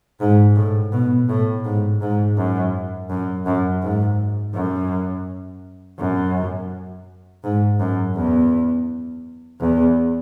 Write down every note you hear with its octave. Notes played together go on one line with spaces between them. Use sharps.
G#2
A2
B2
A2
G#2
G#2
F#2
F#2
F#2
G#2
F#2
F#2
G#2
F#2
E2
E2